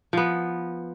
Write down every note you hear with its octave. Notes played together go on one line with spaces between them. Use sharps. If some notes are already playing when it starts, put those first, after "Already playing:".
F3 B3